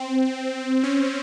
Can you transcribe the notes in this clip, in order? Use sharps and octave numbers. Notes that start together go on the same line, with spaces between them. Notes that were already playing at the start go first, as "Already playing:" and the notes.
Already playing: C4
C#4